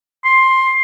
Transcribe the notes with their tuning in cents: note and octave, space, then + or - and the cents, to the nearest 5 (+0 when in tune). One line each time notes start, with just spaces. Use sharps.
C6 +15